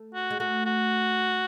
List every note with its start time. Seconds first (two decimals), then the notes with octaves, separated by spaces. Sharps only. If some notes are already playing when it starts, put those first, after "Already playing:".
Already playing: A3
0.14 F#4
0.30 G#3
0.39 A3 F#4
0.66 F#4